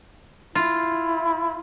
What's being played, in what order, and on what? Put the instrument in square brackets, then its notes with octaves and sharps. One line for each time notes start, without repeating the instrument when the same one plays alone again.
[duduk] E4 [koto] F4